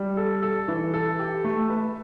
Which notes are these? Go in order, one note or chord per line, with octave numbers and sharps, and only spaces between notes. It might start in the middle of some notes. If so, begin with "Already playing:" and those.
Already playing: G3
A4
A4
E3
A4
G4
A3
B4